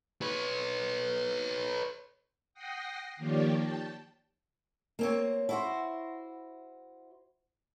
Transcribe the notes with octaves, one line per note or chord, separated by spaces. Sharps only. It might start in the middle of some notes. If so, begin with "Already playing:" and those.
B4 C#5
F#5 G5 D#6 A#6 C7
D#3 F3 A#3 G4 C#5 D5
G5 A5
A#3 C4 C#5
E4 F#4 C5